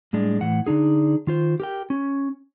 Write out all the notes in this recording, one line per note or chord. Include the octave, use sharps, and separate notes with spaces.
A2 G3 G#3 D4
A2 E3 F#5
D3 D4 D#4 G#4
D#3 F4 C5
G4 A#4 G5
C#4